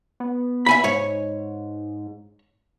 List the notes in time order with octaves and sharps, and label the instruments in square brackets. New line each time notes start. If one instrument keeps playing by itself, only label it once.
[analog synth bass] B3
[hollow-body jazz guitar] E5 G#5 B5
[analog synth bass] G#2 [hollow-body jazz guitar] C#5